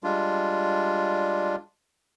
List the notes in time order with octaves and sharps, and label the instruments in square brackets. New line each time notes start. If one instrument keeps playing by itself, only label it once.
[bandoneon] G3 G#3 D4 F4